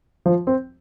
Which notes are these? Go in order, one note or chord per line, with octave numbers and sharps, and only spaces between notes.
F3
C4